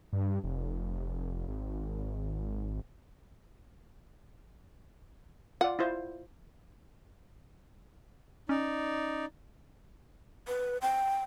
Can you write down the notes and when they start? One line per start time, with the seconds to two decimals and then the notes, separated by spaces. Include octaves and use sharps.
0.13 G2
0.44 F1
1.48 G#1
5.61 F4 D5 F#5
5.79 E4 F4 C5
8.49 C#4 D#4 D5
10.48 B4
10.82 G5